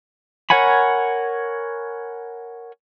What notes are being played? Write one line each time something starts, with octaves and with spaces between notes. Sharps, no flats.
A#4 C#5 F#5 G#5 B5